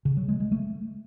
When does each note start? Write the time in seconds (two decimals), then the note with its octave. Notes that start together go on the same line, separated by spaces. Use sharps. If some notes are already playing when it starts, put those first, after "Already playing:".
0.05 C#3
0.17 F#3
0.28 G#3
0.40 G#3
0.52 A3